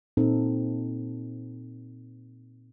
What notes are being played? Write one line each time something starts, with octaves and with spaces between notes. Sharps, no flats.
A#2 C4 D#4 A4